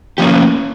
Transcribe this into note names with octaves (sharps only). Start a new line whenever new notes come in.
F3 A#3 C#4 G4